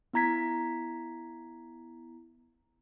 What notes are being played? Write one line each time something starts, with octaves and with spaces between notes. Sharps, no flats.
B3 E4 A#5 G#6 B6